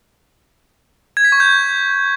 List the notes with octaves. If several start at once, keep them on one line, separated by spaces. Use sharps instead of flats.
G#6
B6
C#6
G6